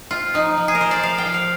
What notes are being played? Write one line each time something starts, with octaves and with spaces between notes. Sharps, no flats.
C4 F4
F3 D#4
F3
G#4
A#4
F3 C5
D5
F3 F5
G5
F3
F5